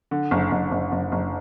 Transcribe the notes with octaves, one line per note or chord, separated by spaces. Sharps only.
D3
F#1
F#1
F#1
F#1
F#1